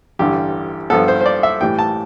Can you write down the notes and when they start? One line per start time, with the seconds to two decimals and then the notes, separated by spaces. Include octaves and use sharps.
0.19 A1 G2 D3 G3 G4
0.90 G2 F3 B3 A4
1.08 C5
1.21 C5
1.26 D5
1.43 E5
1.61 A2 E3 G3 G5
1.79 A5